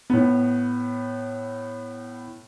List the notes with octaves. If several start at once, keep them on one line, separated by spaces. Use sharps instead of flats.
A2 B3